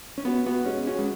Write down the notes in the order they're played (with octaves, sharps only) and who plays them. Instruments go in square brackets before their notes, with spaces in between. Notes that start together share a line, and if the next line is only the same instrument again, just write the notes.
[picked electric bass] C#4
[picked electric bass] B3 [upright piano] F#4
[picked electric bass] B3 [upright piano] F#4
[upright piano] G#3 [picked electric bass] C#4
[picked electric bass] C#4 [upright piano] F#4
[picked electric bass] G#3